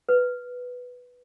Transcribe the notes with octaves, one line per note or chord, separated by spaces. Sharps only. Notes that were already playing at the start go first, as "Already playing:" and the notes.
B4